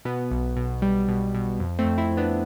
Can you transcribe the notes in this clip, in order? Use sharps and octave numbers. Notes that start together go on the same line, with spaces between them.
B2 B3
B1
B2
G3
B2
B2
F2
A3 C4
F2
C4 E4
F2
B3 D4